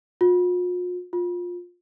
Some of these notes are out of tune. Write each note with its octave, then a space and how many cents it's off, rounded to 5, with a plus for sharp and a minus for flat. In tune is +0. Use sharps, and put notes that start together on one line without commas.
F4 +45
F4 +20